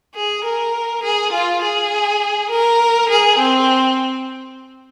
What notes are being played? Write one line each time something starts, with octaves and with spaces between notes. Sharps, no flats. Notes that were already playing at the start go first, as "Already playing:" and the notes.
G#4
A#4
G#4
F4
G#4
A#4
G#4
C4